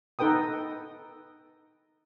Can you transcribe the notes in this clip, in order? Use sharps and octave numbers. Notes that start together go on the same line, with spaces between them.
D#4 A4 B4 G5 D#6